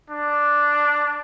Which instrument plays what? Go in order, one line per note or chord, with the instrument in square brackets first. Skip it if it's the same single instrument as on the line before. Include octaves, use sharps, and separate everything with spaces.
[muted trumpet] D4